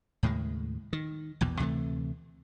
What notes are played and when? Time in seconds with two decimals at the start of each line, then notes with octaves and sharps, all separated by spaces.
0.23 D#2 A2 C#3 G#3
0.93 D#3
1.41 A#1 E2 B2
1.59 D2 C3 E3 A3